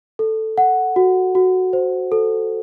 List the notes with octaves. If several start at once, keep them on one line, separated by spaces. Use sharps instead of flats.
A4
F#5
F#4
F#4
C5
A4